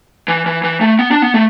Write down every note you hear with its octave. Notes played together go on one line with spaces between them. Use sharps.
E3
E3
E3
A3
B3
D4
B3
A3